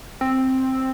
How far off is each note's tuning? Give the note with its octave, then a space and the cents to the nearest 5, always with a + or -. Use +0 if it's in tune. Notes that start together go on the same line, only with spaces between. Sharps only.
C4 +5